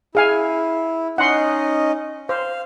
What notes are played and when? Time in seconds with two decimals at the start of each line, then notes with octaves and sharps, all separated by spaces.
0.15 E4 G#4 F5 G#5
1.18 C#4 D#4 D#5 F#5 C6
2.29 C5 F5